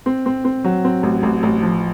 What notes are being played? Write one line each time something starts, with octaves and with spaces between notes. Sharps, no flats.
C4
C4
C4
F#3
C4
A1
A1
A1
F3